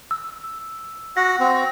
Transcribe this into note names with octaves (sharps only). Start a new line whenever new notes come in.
E6
F#4 F#5 A#6
C4